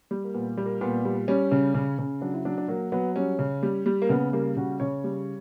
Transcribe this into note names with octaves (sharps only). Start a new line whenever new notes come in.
G3
A#3
A#2 B3
G3
A#3
A#2 B3
G3
G3 C#4
C#3
C#3
C#3
F#3 D4
E4
F#3 D4
D4
F#3 A#3
F#3 B3
G3 C#4
C#3
G3
G3
A#3
C#3 B3
G3 A#3
C#3 F#4
C#3 C#5
G3